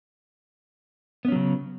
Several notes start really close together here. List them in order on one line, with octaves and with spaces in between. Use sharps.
B3 C#4 F#3 C#3